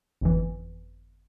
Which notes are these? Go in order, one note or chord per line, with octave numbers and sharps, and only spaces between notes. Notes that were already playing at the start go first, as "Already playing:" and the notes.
G1 F2 E3